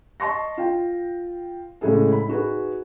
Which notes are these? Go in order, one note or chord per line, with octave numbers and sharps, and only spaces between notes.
D#5 A5 C6 C#6 A#6
F4 G5
A2 C#3 G#3 E4 G#4 A4
B5
D#4 F#4 G#4 B4